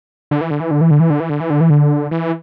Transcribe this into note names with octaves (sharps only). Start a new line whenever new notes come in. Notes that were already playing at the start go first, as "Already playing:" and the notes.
D3
E3
D3
E3
D3
E3
D3
E3
D3
E3
D3
E3
D3
E3
D3
E3